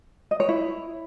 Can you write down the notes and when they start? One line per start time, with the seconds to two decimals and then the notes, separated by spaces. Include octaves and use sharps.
0.31 D#5
0.40 C#5
0.49 E4